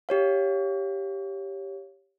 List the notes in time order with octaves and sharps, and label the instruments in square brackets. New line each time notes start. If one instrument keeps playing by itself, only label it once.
[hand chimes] G4 C#5 F5